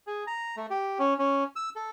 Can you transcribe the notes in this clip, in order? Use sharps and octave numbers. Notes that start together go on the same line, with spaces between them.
G#4
A#5
A3
G4
C#4
C#4
E6
A4